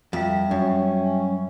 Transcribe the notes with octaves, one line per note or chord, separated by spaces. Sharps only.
F2 G3 E5
F#2 C#4